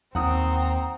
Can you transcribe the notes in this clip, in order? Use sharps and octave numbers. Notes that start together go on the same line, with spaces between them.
D#2 C4 F#5 A#5 D#6